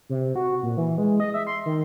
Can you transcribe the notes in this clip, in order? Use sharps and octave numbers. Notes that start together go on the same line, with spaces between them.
C3
F#4
A#2
E3
G#3
D#5
E5
C6
D#3